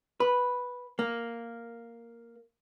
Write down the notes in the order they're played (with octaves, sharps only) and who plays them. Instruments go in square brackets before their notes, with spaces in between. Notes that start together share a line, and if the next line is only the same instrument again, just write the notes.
[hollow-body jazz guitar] B4
A#3